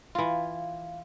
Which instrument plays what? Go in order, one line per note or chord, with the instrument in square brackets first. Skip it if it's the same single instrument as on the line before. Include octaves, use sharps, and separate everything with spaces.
[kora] E3 F4 [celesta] F5